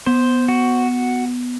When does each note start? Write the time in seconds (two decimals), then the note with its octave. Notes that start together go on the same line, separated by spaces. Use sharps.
0.06 B3 C5
0.48 F#4